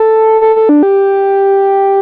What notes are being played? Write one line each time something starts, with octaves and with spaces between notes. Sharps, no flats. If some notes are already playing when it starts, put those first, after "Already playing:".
Already playing: A4
A4
A4
D4
G4